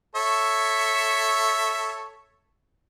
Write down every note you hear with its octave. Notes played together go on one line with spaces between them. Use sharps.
A4 C#5 E5